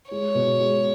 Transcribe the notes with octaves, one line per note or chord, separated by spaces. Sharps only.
G#3 C#5
B2
G#3